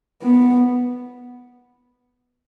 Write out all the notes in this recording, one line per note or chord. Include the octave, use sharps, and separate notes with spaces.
B3